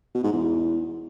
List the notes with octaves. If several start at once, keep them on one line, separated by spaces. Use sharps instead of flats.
B2
G#2
E2